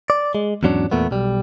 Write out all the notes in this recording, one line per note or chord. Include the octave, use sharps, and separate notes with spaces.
D5
G#3
E2 G#2 F#3 C#4 D4
E2 A#2 A3 B3
B1 G3